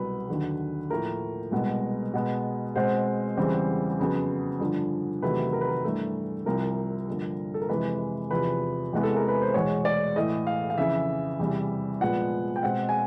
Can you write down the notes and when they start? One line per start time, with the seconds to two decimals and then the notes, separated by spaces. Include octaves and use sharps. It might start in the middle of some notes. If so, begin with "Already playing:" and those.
Already playing: C2 B2 F#3 B4
0.29 D#2 D3 F#3
0.90 A2 F3 A#3 A#4
1.52 C2 B2 G#3 B3
2.14 B2 G#3 B3
2.76 B2 G#3 C4 C5
3.37 E2 C#3 E3 G3 C4
3.99 F2 C#3 F#3 B3
4.60 G2 D3 F3
5.22 E2 C3 D#3 F#3 A3 B4
5.53 A#4
5.61 B4
5.69 A#4
5.84 G2 E3 A3
6.46 C2 C3 F3 A#4
7.08 G2 D3 F3 A#3
7.54 A4
7.62 A#4
7.69 F2 C3 E3 G#3 B4
8.30 E2 C3 F3 B4
8.93 E2 C3 E3 G#3 B3
9.03 A4
9.16 A#4
9.28 B4
9.42 C5
9.54 E2 B2 G#3 C#5
9.85 D5
10.16 A2 E3 A3 D#5
10.47 F5
10.70 F5
10.78 F2 C#3 E3 E5
11.39 E2 C3 E3 G3
12.01 A#2 F3 G#3 B3 F#5
12.56 G5
12.63 B2 G#3 C4 F#5
12.89 G#5